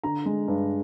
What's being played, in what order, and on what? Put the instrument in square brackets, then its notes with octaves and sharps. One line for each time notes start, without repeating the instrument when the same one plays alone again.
[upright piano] D3 A#5
G#3
G2